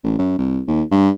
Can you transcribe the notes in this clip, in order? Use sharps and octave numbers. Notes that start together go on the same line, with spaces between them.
A1
F#2
C2
D#2
G2